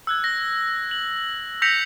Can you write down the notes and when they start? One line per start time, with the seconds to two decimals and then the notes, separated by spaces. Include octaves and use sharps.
0.07 E6 F#6 G#6
0.24 A#6
0.91 F#7
1.62 E6 G6 A#6 B6 C#7 F7